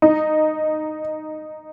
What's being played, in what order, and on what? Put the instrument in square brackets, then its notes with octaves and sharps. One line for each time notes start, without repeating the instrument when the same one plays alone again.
[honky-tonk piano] D#4